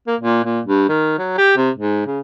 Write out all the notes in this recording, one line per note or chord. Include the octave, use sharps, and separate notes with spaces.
A#3
A#2
A#2
G2
D#3
F#3
G4
C3
G#2
C#3